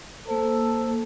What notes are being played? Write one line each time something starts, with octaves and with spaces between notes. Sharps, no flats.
A#3 A4 C5